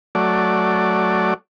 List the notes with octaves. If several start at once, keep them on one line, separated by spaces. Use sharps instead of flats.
F#3 A3 D5